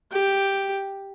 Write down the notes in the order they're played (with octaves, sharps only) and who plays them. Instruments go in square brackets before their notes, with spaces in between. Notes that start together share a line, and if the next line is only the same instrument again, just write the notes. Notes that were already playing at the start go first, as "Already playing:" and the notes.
[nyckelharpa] G4